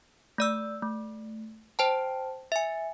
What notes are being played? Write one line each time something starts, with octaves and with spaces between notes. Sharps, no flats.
A3 D5 E6
A3
C5 G5 A5
E5 G#5